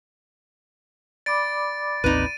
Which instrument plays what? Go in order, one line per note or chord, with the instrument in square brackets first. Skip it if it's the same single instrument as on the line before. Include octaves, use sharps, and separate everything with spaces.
[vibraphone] D5 B5 D6 [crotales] A6 D7
[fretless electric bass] A1 D#2 C4 [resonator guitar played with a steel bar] D#4 B4 [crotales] D#7